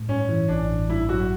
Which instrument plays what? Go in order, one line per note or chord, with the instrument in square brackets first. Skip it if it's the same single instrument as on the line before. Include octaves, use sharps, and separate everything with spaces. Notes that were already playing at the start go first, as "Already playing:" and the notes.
Already playing: [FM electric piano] A2
[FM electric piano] G2 [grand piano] C#4
[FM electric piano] E3
[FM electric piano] A1 [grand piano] D4
[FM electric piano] A1
[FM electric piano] G2 [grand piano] E4
[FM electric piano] F#3 [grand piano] F#4